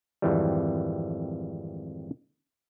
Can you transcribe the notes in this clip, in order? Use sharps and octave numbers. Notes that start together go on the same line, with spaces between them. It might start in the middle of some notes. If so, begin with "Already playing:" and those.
G#1 F2 E3 G3